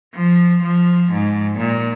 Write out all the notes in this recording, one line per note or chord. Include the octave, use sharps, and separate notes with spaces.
F3
F3
G#2
A#2